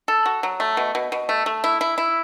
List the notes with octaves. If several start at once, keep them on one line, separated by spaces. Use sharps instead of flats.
A4
F#4
F#3
A3
B2
B2
B2
A3
A3
E4
E4
E4